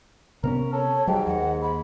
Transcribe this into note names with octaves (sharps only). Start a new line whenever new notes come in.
C3 B3 C#4 A#4
A4 C#5
G#2 F#3 G3 G5
D#2 F#5
B5